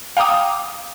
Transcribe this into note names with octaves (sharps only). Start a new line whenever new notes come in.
F5 G5 A#5 D6 D#6